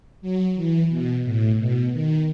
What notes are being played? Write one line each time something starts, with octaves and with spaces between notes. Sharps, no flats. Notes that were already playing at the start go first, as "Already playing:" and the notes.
F#3
E3
B2
A2
B2
D#3